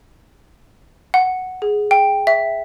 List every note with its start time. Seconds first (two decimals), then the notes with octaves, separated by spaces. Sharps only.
1.14 F#5
1.62 G#4
1.91 G5
2.27 E5